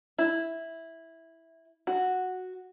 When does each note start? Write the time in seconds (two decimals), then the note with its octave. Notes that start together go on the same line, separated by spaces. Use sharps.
0.18 E4
1.87 F#4